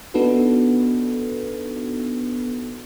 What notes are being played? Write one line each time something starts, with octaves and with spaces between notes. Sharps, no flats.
B3 D4 D#4 F#4 A4 B4